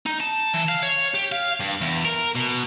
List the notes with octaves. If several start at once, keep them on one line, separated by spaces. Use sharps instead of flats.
D#4
A5
E3
F5
C#5
G4
F5
G2
E2
A#4
B2